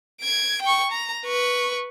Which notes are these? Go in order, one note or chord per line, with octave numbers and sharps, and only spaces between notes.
G#6 D7
G5 C#6
A#5
B4 C#6